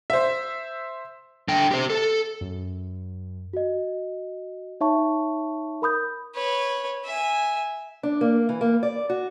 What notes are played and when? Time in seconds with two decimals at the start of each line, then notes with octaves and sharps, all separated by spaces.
0.10 C5 E5
1.48 D3 G5
1.71 G4 C5
1.90 A4
2.41 F#2
3.53 F#4 D#5
4.81 D#4 C#5 E5 A5 C#6
5.82 A#4 B5 D#6 G6
6.35 B4 C#5
7.04 E5 G#5
8.03 D4
8.21 A#3
8.49 E3
8.61 A#3
8.83 D5
9.10 F#4